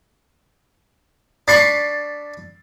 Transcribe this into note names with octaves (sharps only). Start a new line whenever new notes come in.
D4 B5 C#6 A6 C7